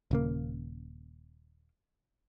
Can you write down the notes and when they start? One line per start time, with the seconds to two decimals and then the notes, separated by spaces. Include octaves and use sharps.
0.11 D#1 C#3 A#3